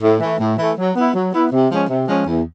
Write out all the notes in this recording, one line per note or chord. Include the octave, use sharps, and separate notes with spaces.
A2
E3 A3
A2
E3 A3
F#3
B3 E4
F#3
B3 E4
C3
F3 G#3 C#4
C3
F3 G#3 C#4
E2